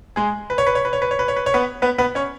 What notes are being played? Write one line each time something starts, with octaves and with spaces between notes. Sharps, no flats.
G#3 G#4
B4
C#5
B4
C#5
B4
C#5
B4
C#5
B4
C#5
B4
C#5
B3 B4
B3 B4
B3 B4
C#4 C#5